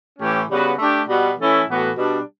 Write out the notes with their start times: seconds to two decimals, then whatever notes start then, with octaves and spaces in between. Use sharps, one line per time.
0.19 A2 E3 A3 C#4 G4
0.49 C#3 G3 B3 F#4 B4
0.78 A3 D4 G4
1.08 B2 G3 B3 F#4
1.38 E3 A3 C#4 E4 A4
1.67 A2 E3 B3 F#4 A4
1.97 B2 G3 D4